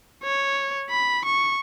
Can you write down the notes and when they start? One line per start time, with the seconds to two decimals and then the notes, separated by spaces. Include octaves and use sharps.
0.23 C#5
0.90 B5
1.25 C#6